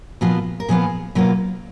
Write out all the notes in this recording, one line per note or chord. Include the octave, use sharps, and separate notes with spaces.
A#2 F3 B3 F4 F#4
A#4
A#2 F3 B3 F4 G#4
B2 F#3 A#3 F4